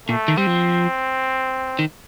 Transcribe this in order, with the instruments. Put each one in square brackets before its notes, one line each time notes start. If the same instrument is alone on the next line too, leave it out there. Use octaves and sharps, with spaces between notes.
[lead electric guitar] A#2 [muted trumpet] A3
[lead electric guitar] D#3
[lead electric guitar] G3 [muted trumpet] C4
[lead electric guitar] F3
D#3